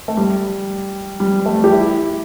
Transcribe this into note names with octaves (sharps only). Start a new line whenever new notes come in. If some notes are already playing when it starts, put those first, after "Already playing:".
A3
G3
G3
A3
G4
E4